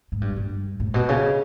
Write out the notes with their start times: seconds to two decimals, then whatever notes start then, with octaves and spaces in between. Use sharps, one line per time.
0.12 G#2
0.21 G2
0.36 G2
0.80 A2
0.94 B2
1.09 C#3